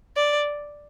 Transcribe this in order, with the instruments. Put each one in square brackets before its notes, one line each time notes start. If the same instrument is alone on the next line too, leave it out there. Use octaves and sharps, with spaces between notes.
[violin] D5